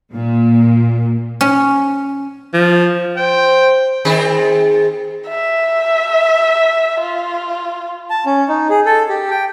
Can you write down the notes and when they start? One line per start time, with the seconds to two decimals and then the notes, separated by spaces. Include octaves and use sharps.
0.13 A#2
1.41 C#4
2.53 F3
3.18 C5 G5
4.05 D#3 C4 G#4
5.28 E5
7.00 F4
8.10 A5
8.26 C#4
8.49 D#4
8.70 G#4
8.86 A4
9.09 G4
9.30 G5